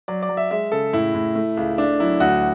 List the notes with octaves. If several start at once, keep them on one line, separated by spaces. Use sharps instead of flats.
F#3 D5
D5
F#3
E5
G#3 E5
C#3 A4
A2 E4
A2
A3
C#2
A3 D4
F#3 E4
D2 F#4